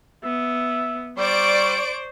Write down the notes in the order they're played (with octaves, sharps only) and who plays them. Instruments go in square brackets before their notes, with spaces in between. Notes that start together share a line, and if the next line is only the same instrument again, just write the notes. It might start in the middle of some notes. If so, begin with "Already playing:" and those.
[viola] B3 [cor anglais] E5
[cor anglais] G3 [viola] C5 [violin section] D5 C#6 D7